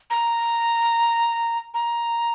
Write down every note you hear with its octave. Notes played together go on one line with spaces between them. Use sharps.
A#5
A#5